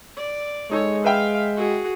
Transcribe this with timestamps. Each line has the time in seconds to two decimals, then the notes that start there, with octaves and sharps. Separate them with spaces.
0.17 D5
0.71 G#3 D#4 G#4 A4 C#5
1.05 B4 E5 F5 G5
1.56 F#4 G#4